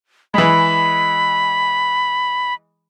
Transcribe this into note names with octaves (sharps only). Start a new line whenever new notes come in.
E3 G#3 B5